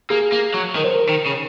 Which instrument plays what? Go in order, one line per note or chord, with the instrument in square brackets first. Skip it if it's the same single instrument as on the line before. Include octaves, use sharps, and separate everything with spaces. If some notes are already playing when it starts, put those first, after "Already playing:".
[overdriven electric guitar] A#3 [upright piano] G#4
[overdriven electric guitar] A#3
F#3
[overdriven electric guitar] D#3 [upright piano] A#4
[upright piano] C5
A#4
[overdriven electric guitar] D#3
C#3